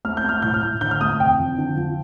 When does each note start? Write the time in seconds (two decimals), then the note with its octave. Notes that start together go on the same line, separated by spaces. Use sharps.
0.05 A3 F6
0.17 G6
0.24 A3
0.29 F6
0.42 A2 G6
0.54 F6
0.62 A2
0.81 D3 G6
0.91 F6
1.01 A3 D#6
1.20 F1 G5
1.38 F2
1.58 D3
1.77 F3